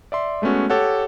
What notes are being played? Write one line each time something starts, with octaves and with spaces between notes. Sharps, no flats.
D5 E5 C6
G#3 A3 B3 C#4 F#4
G4 A4 C#5 F#5